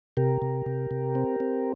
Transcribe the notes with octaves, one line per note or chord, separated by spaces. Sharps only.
C3 G4 A#4
C3
C3
C3
C4
C4